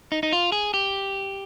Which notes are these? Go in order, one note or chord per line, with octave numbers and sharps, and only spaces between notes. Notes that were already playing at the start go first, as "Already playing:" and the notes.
D#4
D#4
F4
G#4
G4